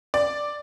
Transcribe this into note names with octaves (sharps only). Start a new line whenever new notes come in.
D5